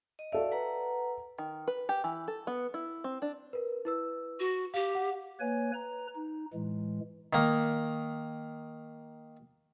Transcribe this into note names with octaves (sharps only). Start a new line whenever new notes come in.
D#5
F#4 A4 D5 E5 F5
B4 F#5 A#5
D#3
B4
G4
E3
A4
B3
E4
C4
D4
A#4 B4
E4 B4 E6
F#4
G4 F5
F#5
A#3 B4 C#5 G#5
B4 A#5
D#4
A2 E3 G#3
D#3 A#3